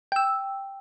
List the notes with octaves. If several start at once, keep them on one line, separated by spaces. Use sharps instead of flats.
G5 E6